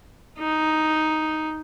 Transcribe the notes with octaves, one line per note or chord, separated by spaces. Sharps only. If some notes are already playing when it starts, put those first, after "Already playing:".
D#4